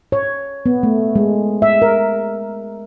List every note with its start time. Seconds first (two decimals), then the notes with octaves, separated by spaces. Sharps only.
0.12 C#5
0.66 B3
0.83 A3
1.16 G#3
1.62 E5
1.82 A#4